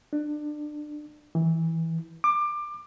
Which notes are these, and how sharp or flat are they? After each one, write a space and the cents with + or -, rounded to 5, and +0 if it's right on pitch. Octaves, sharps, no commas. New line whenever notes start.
D4 +25
E3 -15
D6 +20